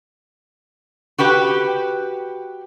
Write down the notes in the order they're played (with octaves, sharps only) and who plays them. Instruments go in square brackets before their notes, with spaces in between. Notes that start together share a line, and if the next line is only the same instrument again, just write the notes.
[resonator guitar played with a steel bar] F#4 G4 B4 G5